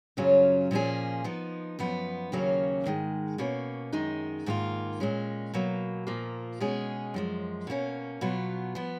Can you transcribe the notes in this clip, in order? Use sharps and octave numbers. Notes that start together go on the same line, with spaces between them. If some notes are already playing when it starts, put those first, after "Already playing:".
F#2 C#3 F#3 C#4 F4
A#2 F3 A#3 C#4 G#4
F3 B3 D#4
F#2 F3 B3
D#2 C#3 F#3 A#3 C#4
G#2 D#3 G#3
B2 A#3 C#4
F#2 D#3 G#3 D#4
G#2 D#3 A#3 F4
A#2 G#3 C#4
B2 F#3 A#3
A#2 F3 A#3
B2 G#3 C#4 G#4
F#2 F3 G#3
B2 A#3 C#4
B2 F#3 B3 F4
F3 B3